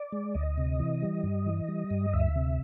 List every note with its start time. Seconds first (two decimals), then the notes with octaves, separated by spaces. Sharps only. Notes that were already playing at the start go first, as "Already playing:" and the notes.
Already playing: D5
0.12 G#3
0.34 D2 D#5
0.58 C3
0.80 E3
1.02 G3
1.23 G2
1.46 E3
1.68 G3
1.91 G2
2.13 D2 E5
2.36 C3